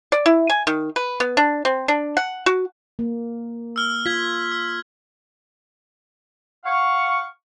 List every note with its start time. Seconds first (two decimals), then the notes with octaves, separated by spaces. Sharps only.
0.12 D5
0.26 E4
0.50 G#5
0.67 D#3
0.96 B4
1.20 B3
1.37 D4
1.65 C4
1.88 D4
2.17 F#5
2.46 F#4
2.99 A#3
3.76 E6 F6 G7
4.06 F4 G#6 B6
4.52 E6
6.65 F5 F#5 C#6